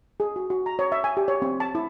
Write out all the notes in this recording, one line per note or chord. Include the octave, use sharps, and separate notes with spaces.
G#4
F#4
F#4
A#5
C#5
E5
G#5
G4
C#5
C4
A5
E4